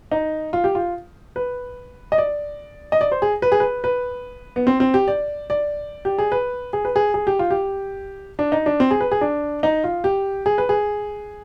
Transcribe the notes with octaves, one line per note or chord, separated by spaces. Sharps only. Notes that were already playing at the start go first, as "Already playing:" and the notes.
D#4
F4
G4
F4
B4
D#5
D5
D#5
D5
C5
G#4
B4
G#4
B4
B4
B3
C4
C4
G4
D5
D5
G4
G#4
B4
G#4
B4
G#4
G#4
G4
F4
G4
D4
D#4
D4
C4
G#4
B4
G#4
D4
D#4
F4
G4
G#4
B4
G#4